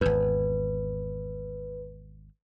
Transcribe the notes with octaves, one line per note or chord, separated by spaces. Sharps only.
G#1 E2 B4